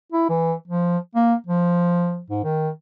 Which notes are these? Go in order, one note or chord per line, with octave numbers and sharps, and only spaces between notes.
E4
E3
F3
A#3
F3
G#2
D#3